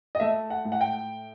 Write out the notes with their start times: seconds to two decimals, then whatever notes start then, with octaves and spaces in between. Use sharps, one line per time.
0.15 D#5
0.20 A3 E5
0.50 F#5
0.65 A2
0.72 F#5
0.81 G5